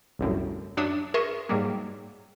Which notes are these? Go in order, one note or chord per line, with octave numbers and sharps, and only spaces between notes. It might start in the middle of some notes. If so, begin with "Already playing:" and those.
G1 C2 F#2 A2
F#2 D4 C#5 E5 D#6
G#4 A#4 E5 C6 C#6 D#6
G#2 F#3 G3 A#3